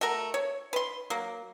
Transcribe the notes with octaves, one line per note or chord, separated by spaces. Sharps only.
A3 F#4 A#4
C#5
B4 C6
F#3 A#3